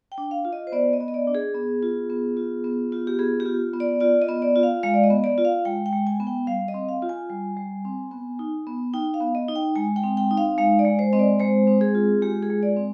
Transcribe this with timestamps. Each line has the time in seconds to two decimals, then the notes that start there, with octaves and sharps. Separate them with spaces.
0.12 G5
0.18 D4
0.31 F5
0.45 F4
0.53 D#5
0.67 C5
0.72 B3 D5
0.93 D#5
1.00 B3
1.08 D#5
1.14 D5
1.27 D4
1.35 G#4
1.55 B3
1.82 F4
2.10 B3
2.37 F4
2.64 B3
2.92 F4
3.07 G4
3.19 B3 G#4
3.40 G4
3.46 F4
3.74 B3
3.80 D5
4.00 F4 D5
4.22 D#5
4.28 B3
4.42 D5
4.56 F4
4.63 F5
4.83 G#3 F5
4.94 D5
5.04 D#5
5.10 B3
5.24 D5
5.38 F4
5.45 F5
5.65 G#3 G5
5.86 G5
5.92 G#3
6.07 G#5
6.20 B3
6.27 G5
6.47 G3 F5
6.68 D#5
6.74 C4
6.89 F5
7.02 F4
7.09 G#5
7.30 G3
7.57 G3
7.85 C4
8.11 B3
8.39 D#4
8.67 B3
8.94 D#4 G5
9.14 F5
9.21 B3
9.35 D#5
9.48 D#4
9.56 G5
9.75 G#3 G#5
9.96 G5
10.04 C4
10.17 G5
10.31 D#4
10.38 F5
10.58 G#3 F5
10.79 D5
10.85 G#3
10.99 C5
11.13 C4 D#5
11.19 D5
11.40 G#3 C5
11.67 C4
11.81 G#4
11.95 F4
12.22 G#3 G4
12.43 G#4
12.50 G#3
12.63 D5
12.77 C4